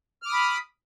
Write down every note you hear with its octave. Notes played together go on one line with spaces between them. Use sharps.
B5 D6 D#6 F6